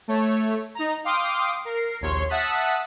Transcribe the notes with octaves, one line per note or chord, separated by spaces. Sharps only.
A3 C#5
D#4 A#5
F5 G5 C6 D6 D#6
A#4 C7
A#1 D#2 C#5 C6
E5 F#5 A5 D#6 F#6 B6